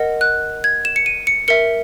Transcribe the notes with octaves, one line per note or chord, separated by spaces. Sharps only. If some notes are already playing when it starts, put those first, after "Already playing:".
Already playing: A#4 D#5 F#5
F#6
G#6
E7
C#7
D#7
C#7
A#4 E5 C#7